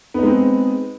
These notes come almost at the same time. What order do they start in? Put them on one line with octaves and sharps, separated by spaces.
B3 D#4 G#3 C4